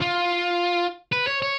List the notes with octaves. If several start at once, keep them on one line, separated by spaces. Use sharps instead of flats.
F4
B4
C#5
C#5